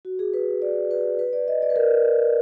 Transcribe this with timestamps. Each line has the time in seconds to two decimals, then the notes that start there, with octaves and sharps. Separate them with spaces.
0.05 F#4
0.19 G#4
0.34 B4
0.62 D5
0.91 B4
1.19 B4
1.33 D5
1.48 D#5
1.62 D5
1.70 B4
1.76 A#4